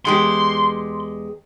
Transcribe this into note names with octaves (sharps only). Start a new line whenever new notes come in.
E2 G#3 G4 C6